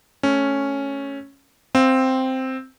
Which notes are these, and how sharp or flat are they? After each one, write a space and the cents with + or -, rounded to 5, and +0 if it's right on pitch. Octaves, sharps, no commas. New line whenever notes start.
A3 +0 C#4 +0
C4 +0 F5 +0